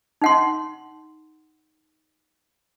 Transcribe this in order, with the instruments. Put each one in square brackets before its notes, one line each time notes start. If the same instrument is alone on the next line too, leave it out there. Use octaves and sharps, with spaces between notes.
[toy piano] D#4 F#5 C6